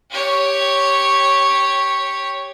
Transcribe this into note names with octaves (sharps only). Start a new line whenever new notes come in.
G4 C#5